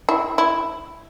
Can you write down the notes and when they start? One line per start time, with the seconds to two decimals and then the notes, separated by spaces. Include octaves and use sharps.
0.09 E4
0.38 E4